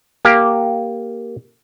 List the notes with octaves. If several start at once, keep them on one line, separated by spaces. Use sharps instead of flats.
A#3 G4 F5